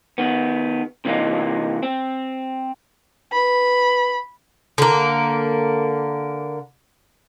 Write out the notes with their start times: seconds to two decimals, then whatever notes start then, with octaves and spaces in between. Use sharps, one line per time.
0.18 D#3 B3
1.05 C3 E3 A#3 D#4
1.83 C4
3.32 B4 B5
4.78 D3 A#3